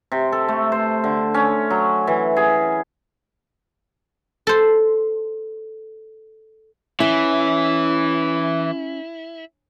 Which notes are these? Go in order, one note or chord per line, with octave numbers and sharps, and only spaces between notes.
C3
A4
A3
C5
D3
C#4
F#3
E3
G#4
A4 C5
E3 C#4 E4